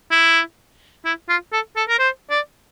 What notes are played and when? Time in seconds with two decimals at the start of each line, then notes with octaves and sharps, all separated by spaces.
0.12 E4
1.05 E4
1.29 F4
1.52 A4
1.76 A4
1.89 A#4
1.99 C5
2.30 D5